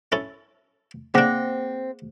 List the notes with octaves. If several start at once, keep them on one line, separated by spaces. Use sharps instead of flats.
C#4 E4 A4
C#3 A#3 C4 D4 G#4 C5 F#5 A#6